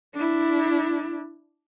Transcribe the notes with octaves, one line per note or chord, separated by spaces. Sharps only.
D4 E4